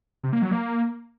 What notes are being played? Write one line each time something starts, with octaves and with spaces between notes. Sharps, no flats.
C3
A#3
F#3
A#3